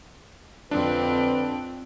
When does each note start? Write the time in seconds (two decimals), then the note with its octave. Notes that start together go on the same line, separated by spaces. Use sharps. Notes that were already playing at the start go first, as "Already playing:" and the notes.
0.71 F2 D3 F3 C4 D4 B4